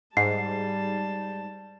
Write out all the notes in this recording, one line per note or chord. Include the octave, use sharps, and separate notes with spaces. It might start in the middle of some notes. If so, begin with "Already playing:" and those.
G#2 G3 A5 C7